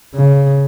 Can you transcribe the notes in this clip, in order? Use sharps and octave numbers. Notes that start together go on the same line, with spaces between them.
C#3